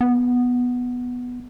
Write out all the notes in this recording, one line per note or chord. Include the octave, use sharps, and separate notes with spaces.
B3